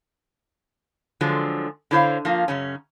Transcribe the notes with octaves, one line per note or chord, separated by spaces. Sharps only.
D3 F3 F#3 G#3
D3 E4 C5 C#5 F5
F3 A#3 F4
F#2 C#3 C#4